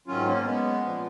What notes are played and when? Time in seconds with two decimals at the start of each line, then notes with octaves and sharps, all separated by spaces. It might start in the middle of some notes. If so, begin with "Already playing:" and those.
0.07 G#2 D#3 F#3 C#4 F4
0.26 A#3 C#4
0.45 G#3 B3
0.82 A#2 F3